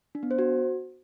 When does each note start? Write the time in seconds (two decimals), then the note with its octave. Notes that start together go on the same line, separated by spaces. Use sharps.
0.15 D4
0.23 B3
0.31 C5
0.39 F#4